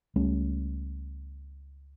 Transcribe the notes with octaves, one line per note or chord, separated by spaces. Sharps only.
C#2 G3 A3 C#4